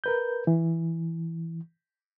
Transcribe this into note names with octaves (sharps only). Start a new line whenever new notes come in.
A#4 B4 G6
E3